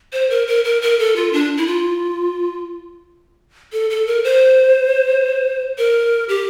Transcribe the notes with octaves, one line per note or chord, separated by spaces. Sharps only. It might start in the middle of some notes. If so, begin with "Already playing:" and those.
C5
A#4
A#4
A#4
A#4
A4
F4
D4
E4
F4
A4
A4
A#4
C5
A#4
G4